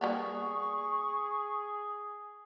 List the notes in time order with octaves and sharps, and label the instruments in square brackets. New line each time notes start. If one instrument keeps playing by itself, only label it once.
[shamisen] G3 A#3 B3 [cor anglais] G#4 [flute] C#6